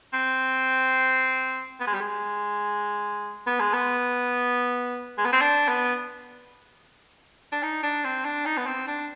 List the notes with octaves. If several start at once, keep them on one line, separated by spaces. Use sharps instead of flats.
C4
B3
G#3
G3
G#3
B3
G#3
B3
G#3
B3
C4
D4
B3
D4
D#4
D4
C4
D4
D#4
B3
C4
D4